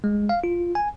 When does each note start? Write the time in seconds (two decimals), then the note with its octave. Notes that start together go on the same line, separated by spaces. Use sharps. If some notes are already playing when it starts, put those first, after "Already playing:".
0.04 G#3
0.29 F5
0.44 F4
0.75 G#5